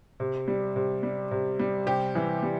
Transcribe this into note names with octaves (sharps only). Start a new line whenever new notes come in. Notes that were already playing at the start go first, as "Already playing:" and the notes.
C3
G3
C3
G3
C3
G3
C3 G4
E3
G3